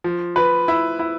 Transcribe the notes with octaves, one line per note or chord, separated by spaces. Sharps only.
F3
F3 B4
E4
E4